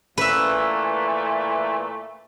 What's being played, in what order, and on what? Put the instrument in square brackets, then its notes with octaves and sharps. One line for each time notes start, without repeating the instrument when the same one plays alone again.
[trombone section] A#2 E3 A3 [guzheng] B4 E5